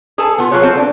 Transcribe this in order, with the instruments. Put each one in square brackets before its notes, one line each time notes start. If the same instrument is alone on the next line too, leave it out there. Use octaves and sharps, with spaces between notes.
[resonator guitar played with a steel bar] G#4 A4 B4 G#5 A5
B3 F4
F#3 F4 G#4 B4 C#5
C4 F4 A4
D4